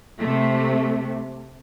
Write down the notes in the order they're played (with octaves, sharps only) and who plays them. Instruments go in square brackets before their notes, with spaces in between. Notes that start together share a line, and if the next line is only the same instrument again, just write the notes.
[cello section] C3 A3